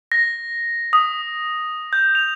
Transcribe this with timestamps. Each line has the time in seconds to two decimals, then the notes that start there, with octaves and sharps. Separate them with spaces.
0.12 A#6
0.93 D#6
1.93 G6
2.15 F7